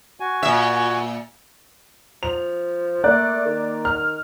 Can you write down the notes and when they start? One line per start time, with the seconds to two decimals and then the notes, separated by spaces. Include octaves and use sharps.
0.20 F#4 G#5
0.43 A#2 E5
2.23 F3 F7
3.04 A3 A#3 D5 F#6
3.45 D#3
3.85 F6